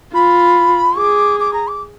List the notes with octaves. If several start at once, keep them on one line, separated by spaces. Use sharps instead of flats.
F4 B5
G#4 D6
D6
A#5
D6